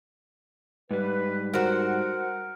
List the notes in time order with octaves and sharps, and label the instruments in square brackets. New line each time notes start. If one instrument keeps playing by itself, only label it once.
[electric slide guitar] G#2 G3 [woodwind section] B4
[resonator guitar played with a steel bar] F#4 C5 [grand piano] A#4 [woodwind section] F#5